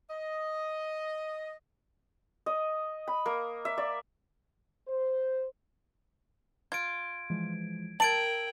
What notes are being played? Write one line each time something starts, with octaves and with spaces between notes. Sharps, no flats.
D#5
D#5
B5
A#3
E5
D5
C5
F4 G#6 D7
E3 F3 G#3
A#4 G5 A5 E6 G#6 D7 F#7